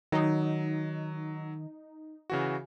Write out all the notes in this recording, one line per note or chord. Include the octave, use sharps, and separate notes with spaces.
D#3 F#3 D#4
C#3 E3 F#4